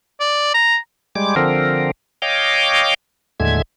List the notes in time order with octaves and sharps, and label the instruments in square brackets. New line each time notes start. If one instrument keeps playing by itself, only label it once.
[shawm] D5
A#5
[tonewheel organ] G3 G#3 D6
D3 F3 C4 A#4
C#5 D#5 F5 G5 D6
D#2 A2 D3 G#3 E5 G#6